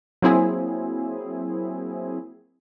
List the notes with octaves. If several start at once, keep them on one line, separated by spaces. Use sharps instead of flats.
F#3 A#3 C4 E4 G#4